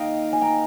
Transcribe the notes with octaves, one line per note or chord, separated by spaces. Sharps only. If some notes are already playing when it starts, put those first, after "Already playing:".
Already playing: D#3 A#3 D#4 D#5 F5 G5
G#5
G5 A#5